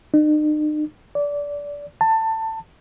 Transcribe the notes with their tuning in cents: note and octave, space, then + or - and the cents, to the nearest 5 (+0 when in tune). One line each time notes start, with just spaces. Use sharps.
D#4 -45
D5 -20
A5 +20